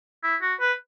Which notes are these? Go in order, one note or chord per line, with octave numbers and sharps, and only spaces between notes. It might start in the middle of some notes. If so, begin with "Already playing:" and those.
E4
F#4
B4